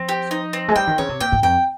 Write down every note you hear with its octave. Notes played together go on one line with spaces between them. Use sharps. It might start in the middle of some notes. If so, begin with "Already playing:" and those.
Already playing: F3 C4
G4
D#4
C4
G#3
G3 G5
D#3
C#3 C#5
C3
A#2 G5
G#2
F2 G5